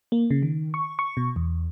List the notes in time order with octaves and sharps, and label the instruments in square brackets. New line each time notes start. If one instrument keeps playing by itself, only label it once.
[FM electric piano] A#3
C#3
D#3
C#6
C#6
B2
E2